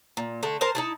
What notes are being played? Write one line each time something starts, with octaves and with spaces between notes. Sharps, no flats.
A#2
D3 A3
A#4 C5 A5
D#4 E4 A5